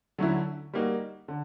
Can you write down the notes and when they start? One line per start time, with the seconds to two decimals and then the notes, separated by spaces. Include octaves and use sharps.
0.18 D3 F#3 A3 C#4 E4
0.74 G3 A#3 D#4 F#4
1.28 D3